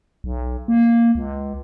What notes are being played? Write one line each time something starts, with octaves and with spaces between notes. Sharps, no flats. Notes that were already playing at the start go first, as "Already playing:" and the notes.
B1
A#3
C#2